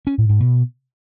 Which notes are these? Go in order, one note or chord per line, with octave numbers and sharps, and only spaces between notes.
C#4
A2
G#2
B2